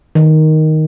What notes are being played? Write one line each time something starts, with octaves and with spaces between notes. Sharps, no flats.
D#3